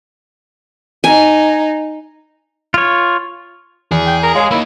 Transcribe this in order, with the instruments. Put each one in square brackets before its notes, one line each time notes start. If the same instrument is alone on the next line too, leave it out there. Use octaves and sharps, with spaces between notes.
[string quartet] D#4 [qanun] G#5
[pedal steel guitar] F4 C#5
[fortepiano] E2 [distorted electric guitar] G#4
[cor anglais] G5
A#4
[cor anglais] G#3 [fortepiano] C#5 F5
[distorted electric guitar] A#3 D#4 [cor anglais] E4